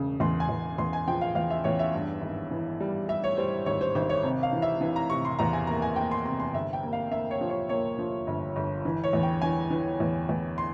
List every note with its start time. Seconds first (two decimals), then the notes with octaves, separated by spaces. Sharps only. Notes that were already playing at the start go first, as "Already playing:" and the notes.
Already playing: E1 C#3
0.20 E2 C6
0.40 G#5
0.49 E2
0.78 E2 C6
0.93 G#5
1.08 F3 G5
1.21 F5
1.35 E2 F5
1.50 E5
1.64 E2 C#5
1.79 E5
1.94 G2
2.22 G#1
2.51 E3
2.80 G3
3.09 G3 E5
3.24 C#5
3.37 G3 C5
3.66 G#1 C#5
3.81 C5
3.95 G#1 C5
4.10 C#5
4.23 C3
4.43 F5
4.53 E3
4.62 E5
4.81 E3
4.96 A#5
5.10 C3 C#6
5.25 C6
5.39 E2 A#5
5.53 G#5
5.67 A#3 A#5
5.82 G#5
5.96 A#3 G5
6.11 C6
6.25 C3 C6
6.40 C6
6.54 G1 E5
6.73 G5
6.83 A#3
6.93 F5
7.11 A#3 E5
7.31 C#5
7.41 F3
7.50 C#5
7.69 A#3 C#5
7.99 F3
8.27 G1
8.56 G1
8.85 E3
9.04 C#5
9.13 E2
9.23 G5
9.42 E3 G#5
9.70 E3
10.00 E2
10.29 E2
10.58 C6